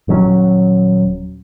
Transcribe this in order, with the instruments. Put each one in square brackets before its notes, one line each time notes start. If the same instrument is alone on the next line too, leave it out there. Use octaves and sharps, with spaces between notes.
[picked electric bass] D#1 G2 F#3 C#4